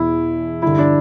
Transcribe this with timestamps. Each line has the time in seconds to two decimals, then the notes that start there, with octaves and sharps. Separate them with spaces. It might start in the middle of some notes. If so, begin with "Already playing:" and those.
Already playing: E2 B2 E4
0.62 G2 D3 E4
0.79 D4